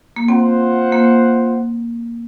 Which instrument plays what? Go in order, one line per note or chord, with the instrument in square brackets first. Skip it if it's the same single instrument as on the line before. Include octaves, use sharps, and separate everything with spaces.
[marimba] A#3
[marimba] C4 [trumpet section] F4 C5 F#5
[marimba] A#3